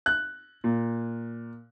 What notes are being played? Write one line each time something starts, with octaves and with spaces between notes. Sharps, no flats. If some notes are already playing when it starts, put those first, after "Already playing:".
F#6
A#2